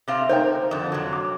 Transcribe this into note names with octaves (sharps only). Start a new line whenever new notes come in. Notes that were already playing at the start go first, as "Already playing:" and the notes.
C3 C4 F5
D#4 A#4 C5 G5
F2 D3
C3 F#3
D6